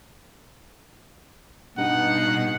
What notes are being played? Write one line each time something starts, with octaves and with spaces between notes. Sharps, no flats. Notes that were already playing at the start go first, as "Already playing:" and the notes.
G2 B2 D#4 F#5